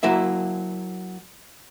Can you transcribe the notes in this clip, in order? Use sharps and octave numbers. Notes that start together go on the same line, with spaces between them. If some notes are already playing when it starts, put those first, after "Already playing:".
F#3 A#3 E4 E5